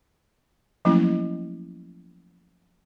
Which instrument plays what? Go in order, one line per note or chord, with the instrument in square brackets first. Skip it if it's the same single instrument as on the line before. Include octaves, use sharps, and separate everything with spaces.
[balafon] F3 F#3 A3 A#3 C#4 E4